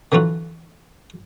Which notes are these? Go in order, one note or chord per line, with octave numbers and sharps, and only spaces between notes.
D3 E3 F#3 F4 F#4